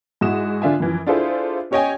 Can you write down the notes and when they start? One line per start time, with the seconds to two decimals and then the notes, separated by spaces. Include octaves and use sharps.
0.21 G#2 E4 F#4 D#6 E7
0.62 D3 D4 F4 E5 G#5
0.80 F#2 E3 F3
1.06 D4 E4 F4 G#4 A4 C5
1.71 C#4 G4 C#5 D#5 G5 G#5